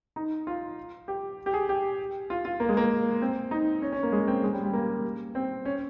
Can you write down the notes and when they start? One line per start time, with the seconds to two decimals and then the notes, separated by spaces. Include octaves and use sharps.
0.16 D#4
0.47 F4
1.08 G4
1.46 G4
1.54 G#4
1.69 G4
2.30 F4
2.45 F4
2.60 A#3
2.69 G#3
2.77 A#3
3.22 C4
3.51 D#4
3.82 C#4
3.92 C#4
4.03 A#3
4.12 G#3
4.27 C4
4.43 G#3
4.53 G3
4.64 G3
4.73 A#3
5.35 C4
5.65 C#4